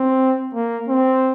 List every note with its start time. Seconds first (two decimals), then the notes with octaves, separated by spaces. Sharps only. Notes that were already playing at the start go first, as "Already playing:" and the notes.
Already playing: C4
0.54 A#3
0.88 C4